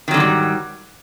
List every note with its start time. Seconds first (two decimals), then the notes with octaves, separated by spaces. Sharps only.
0.08 D#3
0.11 F#3
0.14 D3
0.17 G#2
0.20 G3